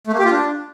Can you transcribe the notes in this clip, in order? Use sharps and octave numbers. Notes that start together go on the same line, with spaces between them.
A3
A#3
G4
F4
D4